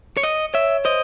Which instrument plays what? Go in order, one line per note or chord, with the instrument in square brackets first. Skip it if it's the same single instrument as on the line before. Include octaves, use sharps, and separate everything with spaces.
[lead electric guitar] C#5
D#5
[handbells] C#5 [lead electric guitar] E5
[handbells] C5 [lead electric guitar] D#5